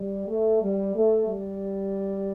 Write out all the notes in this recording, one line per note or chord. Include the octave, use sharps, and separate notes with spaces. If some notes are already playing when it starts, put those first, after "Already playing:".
Already playing: G3
A3
G3
A3
G3